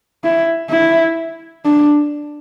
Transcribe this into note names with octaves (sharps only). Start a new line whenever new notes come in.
E4
E4
D4